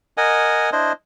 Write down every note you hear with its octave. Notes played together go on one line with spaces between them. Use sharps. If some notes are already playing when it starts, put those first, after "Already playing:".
A#4 D#5 F#5 G#5
D4 E4 C5 D#5